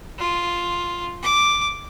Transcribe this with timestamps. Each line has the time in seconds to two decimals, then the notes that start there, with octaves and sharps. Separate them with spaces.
0.19 F4
1.23 D6